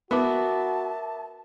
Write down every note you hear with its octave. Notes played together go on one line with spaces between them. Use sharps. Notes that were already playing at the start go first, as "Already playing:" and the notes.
B3 F#4 A#4 E5 A5 D6